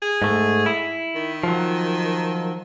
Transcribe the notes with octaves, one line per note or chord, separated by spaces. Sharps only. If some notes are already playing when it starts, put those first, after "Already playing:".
G#4
G#2 A3
E4
D#3
F3 F#3